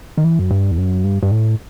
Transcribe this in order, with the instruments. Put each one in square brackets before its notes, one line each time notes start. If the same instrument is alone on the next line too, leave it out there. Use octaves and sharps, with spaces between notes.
[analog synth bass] D#3
E3
F#2
G2
E2
F#2
G2
G2
A2